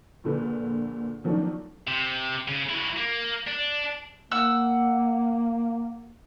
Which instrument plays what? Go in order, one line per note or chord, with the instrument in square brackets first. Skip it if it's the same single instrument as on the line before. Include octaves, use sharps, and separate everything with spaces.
[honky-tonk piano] A#1 A#2 D3 B4
D#3 F3 F#3 A3 C#4 D4
[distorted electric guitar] C3
C#3
F#3 E4
A#3
D4
[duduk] A#3 [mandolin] F#5 E6